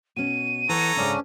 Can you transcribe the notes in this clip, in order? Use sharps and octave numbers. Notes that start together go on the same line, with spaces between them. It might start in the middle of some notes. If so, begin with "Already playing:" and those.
B2 C#4 D#7
E3 A4 C#5 F#5 A#5
G#2 C#3 C#4 D4